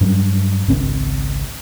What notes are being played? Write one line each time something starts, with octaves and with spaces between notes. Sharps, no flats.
G2 F#3 G3
G#1 C#2 C4